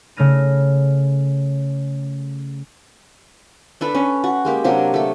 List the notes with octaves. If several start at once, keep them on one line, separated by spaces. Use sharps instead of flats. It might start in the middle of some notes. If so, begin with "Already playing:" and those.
C#3 A3 F6 A#6 D#7
D4 A4 B4
C#4
F#4
G#3 A#3 G4
C3 F#3 A#3 D4
A3 A4